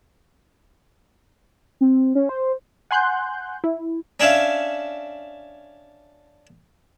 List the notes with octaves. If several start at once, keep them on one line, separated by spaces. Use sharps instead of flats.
C4
C#4
C5
F#5 G#5 C6 F#6 G6
E4
C#4 D4 C#5 E5 F5